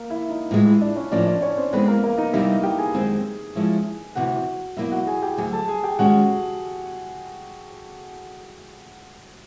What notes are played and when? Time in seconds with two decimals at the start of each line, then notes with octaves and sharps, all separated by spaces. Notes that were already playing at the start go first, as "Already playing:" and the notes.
Already playing: A#3 A#4
0.10 E4 E5
0.30 D#4 D#5
0.50 A2 E3 G#3 F4 F5
0.65 E4 E5
0.81 D4 D5
0.96 C#4 C#5
1.11 A2 F3 A#3 C#4 D4 D5
1.26 D4 D5
1.42 C#4 C#5
1.57 C4 C5
1.73 E3 G#3 B3 C4 B4
1.88 A#3 A#4
2.04 A#3 A#4
2.18 D#4 D#5
2.33 C3 E3 G3 A#3 D#4 E4 E5
2.63 G4 G5
2.78 G#4 G#5
2.94 F#2 D#3 G#3 C4
3.55 F3 G#3 C#4 E4 A4
4.15 D2 C3 E3 F#4 F#5
4.77 B2 F#3 A#3 D#4 E4 E5
4.92 F#4 F#5
5.07 G#4 G#5
5.23 G4 G5
5.37 D2 D3 F#3 G#4 G#5
5.52 A4 A5
5.68 G#4 G#5
5.83 G4 G5
5.99 D#3 G#3 C#4 F#4 F#5